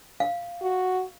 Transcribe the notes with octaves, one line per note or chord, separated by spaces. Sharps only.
F5
F#4